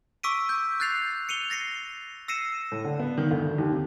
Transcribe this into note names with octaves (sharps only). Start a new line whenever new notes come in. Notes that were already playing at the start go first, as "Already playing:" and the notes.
C#6 D6 E6 B6 D7 D#7
G6
F#6 G6 A6 C7 F7
C#7 D#7 F7 G7
A6 A#6 C7 C#7
E6 A#6 C7 C#7 D#7 E7
A2
D3
B3
D#3
D2
D#2
C3